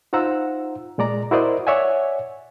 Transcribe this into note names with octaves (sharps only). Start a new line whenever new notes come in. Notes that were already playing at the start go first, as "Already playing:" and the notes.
D#4 F4 C5 F#5 A#5 E6
A#2 G#3 D5 A#5
E4 F#4 A#4 C5 D5 D#5
C#5 D5 E5 F#5 G#5